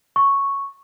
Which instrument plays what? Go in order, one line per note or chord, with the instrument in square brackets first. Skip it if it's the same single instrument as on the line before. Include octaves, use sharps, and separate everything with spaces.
[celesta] C#6